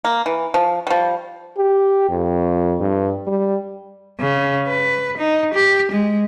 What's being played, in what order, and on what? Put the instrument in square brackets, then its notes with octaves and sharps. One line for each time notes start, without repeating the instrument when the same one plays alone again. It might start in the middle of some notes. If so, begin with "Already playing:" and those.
[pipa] A#3
E3
F3
F3 G3
[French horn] G4
F2
G2
G3
[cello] C#3
B4
D#4
G4
G#3